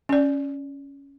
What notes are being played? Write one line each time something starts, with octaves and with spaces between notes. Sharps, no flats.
C#4 D5